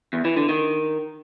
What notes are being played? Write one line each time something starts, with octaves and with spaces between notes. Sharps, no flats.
E2
E3
D3
D#3